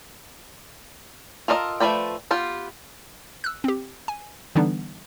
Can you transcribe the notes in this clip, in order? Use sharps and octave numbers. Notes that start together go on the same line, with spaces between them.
F4 A4 A#4 D5 D#5
F3 A3 B4 D5 G5
B3 F4 G4
E6 F#6
C4 G4
G#5
D3 E3 G3 B3 D4 D#4